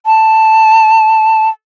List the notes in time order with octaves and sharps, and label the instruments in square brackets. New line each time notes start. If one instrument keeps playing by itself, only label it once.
[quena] A5